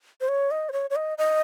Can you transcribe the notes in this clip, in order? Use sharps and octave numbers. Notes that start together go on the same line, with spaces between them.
C5
C#5
D#5
C5
C#5
C#5
D#5
D#5